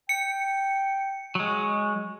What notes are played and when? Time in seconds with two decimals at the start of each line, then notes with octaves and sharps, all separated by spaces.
0.09 G5 C#7
1.35 F#3 G#3 C#6